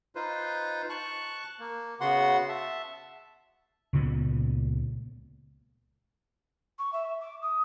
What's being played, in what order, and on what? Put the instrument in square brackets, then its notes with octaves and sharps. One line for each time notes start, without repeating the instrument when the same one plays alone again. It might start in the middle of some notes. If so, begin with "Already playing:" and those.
[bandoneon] D#4 F4 B4 C5
A5 C#6 F#6
A#3
C#3 B3 F#4 F#5 C6
E5 A5
[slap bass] C#2 A#2 B3
[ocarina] C#6
E5
D6
D#6